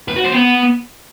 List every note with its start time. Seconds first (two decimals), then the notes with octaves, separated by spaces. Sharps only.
0.08 B4
0.16 F#4
0.24 C5
0.32 B3